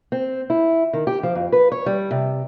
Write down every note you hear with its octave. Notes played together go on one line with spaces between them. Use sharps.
C4
E4
D#3
G4
F3
F2
B4
C#5
G3
C3